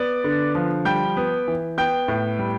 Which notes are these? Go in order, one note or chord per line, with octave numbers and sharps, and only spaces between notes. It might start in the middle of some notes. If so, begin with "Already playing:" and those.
Already playing: B3 D5
D3
F3
G3 G5 G6
B3
E3
B3 G5 G6
A2
G3